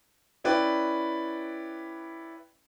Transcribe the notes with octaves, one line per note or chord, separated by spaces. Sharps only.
C#4 E4 B4 D5 G5